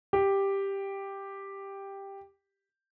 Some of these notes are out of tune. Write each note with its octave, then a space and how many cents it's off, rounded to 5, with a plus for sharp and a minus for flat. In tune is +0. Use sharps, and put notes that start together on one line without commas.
G4 +5